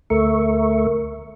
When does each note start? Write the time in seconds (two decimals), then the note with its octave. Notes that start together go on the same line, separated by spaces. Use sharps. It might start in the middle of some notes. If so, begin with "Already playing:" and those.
0.10 D2 A3 A#4 E5 C#6